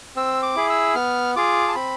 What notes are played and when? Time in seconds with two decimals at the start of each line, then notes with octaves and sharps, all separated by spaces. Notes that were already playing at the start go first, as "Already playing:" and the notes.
0.16 C4 E6
0.43 D6
0.56 E4 G#4
0.70 E6
0.95 B3 F6
1.36 F4 G#4 D6
1.68 A5
1.75 C4 B5